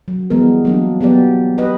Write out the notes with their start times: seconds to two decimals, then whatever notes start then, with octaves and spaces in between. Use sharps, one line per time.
0.08 F#3
0.30 E3 G3 G#3 B3 A#4
0.65 F#3 A#3 D4
1.01 F#3 B3 G4 D5
1.58 G4 B4 D#5